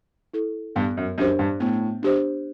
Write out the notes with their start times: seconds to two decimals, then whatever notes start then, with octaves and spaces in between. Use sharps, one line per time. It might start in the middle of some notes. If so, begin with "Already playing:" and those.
0.34 E4 A4
0.76 G2 B3
0.97 F#2
1.18 F#2 D4 G4 C5
1.39 G2
1.60 A2 B3
2.03 D4 G4 C5